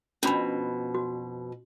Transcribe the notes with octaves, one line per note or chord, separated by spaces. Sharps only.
F2 B2 C#4 D4 B5
F#4